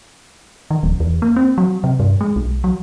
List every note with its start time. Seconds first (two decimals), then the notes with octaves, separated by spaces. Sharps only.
0.71 D#3
0.83 D1
1.00 E2
1.22 A#3
1.36 C4
1.58 F#3
1.84 C3
2.00 G2
2.21 G#3
2.36 B1
2.64 F#3